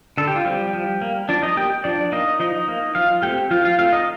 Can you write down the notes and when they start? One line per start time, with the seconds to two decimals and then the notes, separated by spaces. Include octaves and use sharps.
0.18 D3 A4
0.28 G4
0.36 F4
0.44 F3 G3 C4 G4
0.73 F3
1.02 A#3
1.29 F3 D4 D5
1.42 D#4 D#5
1.57 A#3 G4 G5
1.84 F3 D4 D5
2.12 A#3 D#4 D#5
2.40 F3 D#4 D#5
2.68 A#3
2.95 F3 F4 F5
3.22 A3 C4 G4 G5
3.51 F3 F4 F5
3.64 F4 F5
3.78 A3 C4 F4 F5
3.92 D#4 D#5